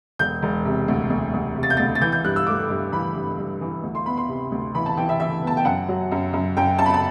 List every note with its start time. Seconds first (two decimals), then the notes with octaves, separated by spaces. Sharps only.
0.19 E1 G6
0.42 E1
0.65 C3
0.88 D2
1.10 D2
1.34 D2
1.56 C3
1.63 A6
1.70 G6
1.77 D2 A6
1.95 A6
2.01 E3 G6
2.12 G6
2.24 G2 F#6
2.36 E6
2.47 A3 D6
2.70 G2
2.92 E3 B5
3.15 G2
3.38 G2
3.61 E3
3.83 D2
3.95 C6
4.06 B3 B5
4.17 C6
4.28 C3
4.52 D2
4.75 E3 B5
4.86 A5
4.97 E3 G5
5.09 E5
5.20 E3 E5
5.43 B3 A5
5.57 G5
5.65 F#2 F#5
5.88 F#3
6.12 F#2
6.33 F#2
6.57 F#2 G5
6.79 F#2 A5
6.86 B5
6.94 A5